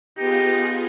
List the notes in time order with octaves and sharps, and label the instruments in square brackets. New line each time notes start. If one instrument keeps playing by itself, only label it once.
[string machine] B3 F4 G#4 [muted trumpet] D#4 [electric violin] G4